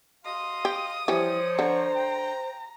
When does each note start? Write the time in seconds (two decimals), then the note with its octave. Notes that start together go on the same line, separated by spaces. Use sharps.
0.25 F#4 D#5 F5 C6 D#6
0.65 G4
1.08 E3 F3 G3 C5 C#5
1.59 D3 A#5
1.96 G5